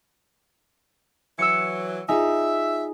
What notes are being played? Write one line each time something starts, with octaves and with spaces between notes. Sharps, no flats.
E3 F#3 E6 C#7
D#4 F4 G#4 E5 G#5